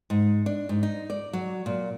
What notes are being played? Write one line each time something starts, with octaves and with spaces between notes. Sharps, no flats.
G#2
D4
G#2
D#4
D5
F#3
A#2